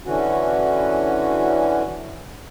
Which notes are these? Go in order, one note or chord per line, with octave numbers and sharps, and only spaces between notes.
D3 E3 C#4 F#4